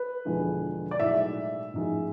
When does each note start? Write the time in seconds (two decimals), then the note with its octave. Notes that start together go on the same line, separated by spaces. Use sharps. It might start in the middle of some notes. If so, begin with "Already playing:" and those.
Already playing: B4
0.25 E1 E2 D3 F3 G#3
0.91 D5
1.00 B1 A2 G#3 E5
1.74 A1 G#2 F3 G#3